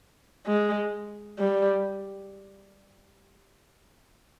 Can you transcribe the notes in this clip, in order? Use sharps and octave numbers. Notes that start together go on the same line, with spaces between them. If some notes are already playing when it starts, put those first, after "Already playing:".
G#3
G3